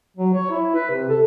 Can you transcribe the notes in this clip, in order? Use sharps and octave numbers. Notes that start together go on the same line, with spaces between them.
F#3
C#5
E4
B4
C3
A4